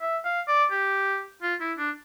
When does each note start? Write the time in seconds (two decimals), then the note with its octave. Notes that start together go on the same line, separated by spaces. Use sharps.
0.01 E5
0.25 F5
0.48 D5
0.72 G4
1.42 F4
1.61 E4
1.78 D4